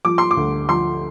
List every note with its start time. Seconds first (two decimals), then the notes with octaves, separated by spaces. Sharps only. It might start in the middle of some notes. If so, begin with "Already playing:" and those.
0.05 F3 D6
0.18 C6
0.31 D6
0.37 D2
0.69 F3 C6